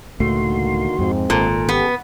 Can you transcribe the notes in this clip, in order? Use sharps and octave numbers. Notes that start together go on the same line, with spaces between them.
C#2 A2 D3 D#3 A3 A#3 F#4 C6
F2 G#2 G#3 C4
G#1 A#2 A4
C#3 B3 G4